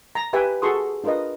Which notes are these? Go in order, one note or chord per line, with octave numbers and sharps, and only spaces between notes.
A#5
G4 B4 E5 G5 G#5
F#4 G#4 A4 C6 C#6 D#6
D4 F4 A#4 B4 D#5